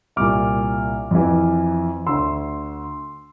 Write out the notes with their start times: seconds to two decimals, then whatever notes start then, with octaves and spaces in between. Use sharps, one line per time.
0.16 C2 A#2 D6 F6
1.11 F2 E3
2.06 D2 D3 C6 E6